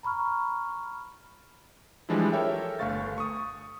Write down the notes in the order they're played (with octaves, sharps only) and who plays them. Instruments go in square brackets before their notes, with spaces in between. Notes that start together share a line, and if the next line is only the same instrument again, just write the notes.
[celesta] A#5 B5 C#6 F6
[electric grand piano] E3 F3 G3 G#3 D4 E4
A4 A#4 C#5 E5 G5
G1 A3 F5 C#6 A6
C#6 D#6